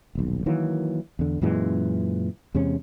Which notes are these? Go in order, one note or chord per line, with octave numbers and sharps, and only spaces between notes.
D#1 B1
D#3 E3 F#3 A#3
E2 D3
F#2 A#2 E3 G#3
E2 C3 G#3 C#4